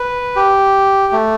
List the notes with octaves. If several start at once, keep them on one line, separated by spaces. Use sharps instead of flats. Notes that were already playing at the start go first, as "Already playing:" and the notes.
Already playing: B4
G4
A3